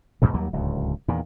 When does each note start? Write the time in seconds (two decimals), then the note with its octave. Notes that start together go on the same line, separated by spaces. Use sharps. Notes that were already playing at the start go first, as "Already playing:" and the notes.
0.22 E2 G#2 B2 D3
0.34 D#2 F#3 G3 A#3
0.53 D1 C#2
1.08 E2 A#2 D#3